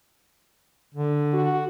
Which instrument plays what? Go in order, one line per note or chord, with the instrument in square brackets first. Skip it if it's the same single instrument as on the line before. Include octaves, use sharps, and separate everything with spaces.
[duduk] D3
[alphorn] F#4